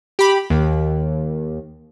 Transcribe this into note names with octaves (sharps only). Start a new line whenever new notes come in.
G4 B5
D#2